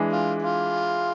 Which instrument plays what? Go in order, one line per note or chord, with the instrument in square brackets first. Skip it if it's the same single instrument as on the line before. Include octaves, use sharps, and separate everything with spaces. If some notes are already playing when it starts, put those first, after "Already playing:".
Already playing: [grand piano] E3 G#3 D4
[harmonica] F4
F4